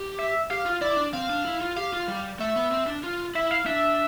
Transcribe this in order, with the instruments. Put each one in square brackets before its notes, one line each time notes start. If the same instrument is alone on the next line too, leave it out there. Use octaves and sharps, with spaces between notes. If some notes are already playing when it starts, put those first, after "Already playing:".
Already playing: [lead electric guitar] G4
[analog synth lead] E5
[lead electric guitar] G4 [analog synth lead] F5
[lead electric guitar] F4
[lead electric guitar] E4 [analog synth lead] D5
[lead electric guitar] D4
[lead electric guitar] C4 [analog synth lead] F5
[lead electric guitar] D4
E4
F4
[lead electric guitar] G4 [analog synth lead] F5
[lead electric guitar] F4
G3
[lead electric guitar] A3 [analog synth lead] E5
[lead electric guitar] B3
C4
D4
F4
[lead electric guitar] E4 [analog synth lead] E5
[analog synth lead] F5
[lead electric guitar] D4 [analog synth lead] E5